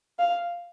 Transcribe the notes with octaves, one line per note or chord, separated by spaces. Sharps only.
F5